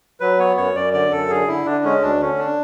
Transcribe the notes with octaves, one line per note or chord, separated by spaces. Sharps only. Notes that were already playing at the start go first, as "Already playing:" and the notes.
F#3 B4
B3 C#5
F#2 C#5
F#2 D5
D3 D5
F#2 A4
D3 G#4
D3 E4
D3 D4
G#3 C#4
D2 D4
D3 C#4
D4